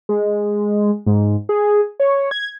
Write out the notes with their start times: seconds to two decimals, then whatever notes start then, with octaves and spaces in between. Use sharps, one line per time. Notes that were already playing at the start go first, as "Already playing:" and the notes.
0.09 G#3
1.06 G#2
1.49 G#4
2.00 C#5
2.31 G#6